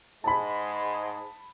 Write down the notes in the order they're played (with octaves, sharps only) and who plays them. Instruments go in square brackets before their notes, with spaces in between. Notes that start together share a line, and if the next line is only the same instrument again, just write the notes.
[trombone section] G#2 G#3 [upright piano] A5 B5